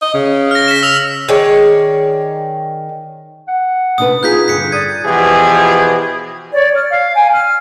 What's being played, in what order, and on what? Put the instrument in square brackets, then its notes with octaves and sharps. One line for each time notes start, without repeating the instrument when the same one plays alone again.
[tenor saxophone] D#5
C#3
[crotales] F6 A#6
B6 E7
E6 F7
[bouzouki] D#3 G#4 C#5 D5
[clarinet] F#5
[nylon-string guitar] C3 D4 B4 [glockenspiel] D#6
[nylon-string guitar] C4 F4 [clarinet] D#4 [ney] G#4 [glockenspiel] F#6 G6 B6
[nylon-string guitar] G2 D3 [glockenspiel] B6 C#7
[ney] D5 [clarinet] D#6 [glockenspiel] G#6
[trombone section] B2 E3 F3 G4 G#4
[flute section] C#5 D5
F6
F5
G5 G#5
F6